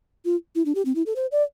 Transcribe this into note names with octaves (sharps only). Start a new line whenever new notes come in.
F4
E4
D4
G4
C4
E4
A4
C5
D5